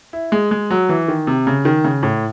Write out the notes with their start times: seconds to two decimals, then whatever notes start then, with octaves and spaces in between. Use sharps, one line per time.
0.13 E4
0.32 G#3
0.51 G#3
0.70 F#3
0.89 E3
1.08 D#3
1.27 C3
1.47 C#3
1.65 D#3
1.84 C#3
2.03 A2